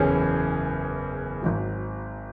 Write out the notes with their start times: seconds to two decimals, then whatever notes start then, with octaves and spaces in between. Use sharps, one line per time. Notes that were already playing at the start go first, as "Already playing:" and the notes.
Already playing: F#1 E2 E3 C#4 G#4
1.42 G#1 G#2 F#3